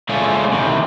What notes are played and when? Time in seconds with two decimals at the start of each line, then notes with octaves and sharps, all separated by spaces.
0.09 D3 G#3 A3 C#4 F4 G#4
0.52 C3 D#3 E3